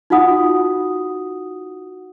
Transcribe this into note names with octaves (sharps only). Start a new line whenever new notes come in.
D#4 F4 F#4 F#5 D#6